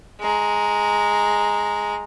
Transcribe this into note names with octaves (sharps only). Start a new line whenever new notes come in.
G#3 A#5